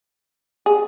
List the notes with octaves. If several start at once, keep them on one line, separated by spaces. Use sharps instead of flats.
G#4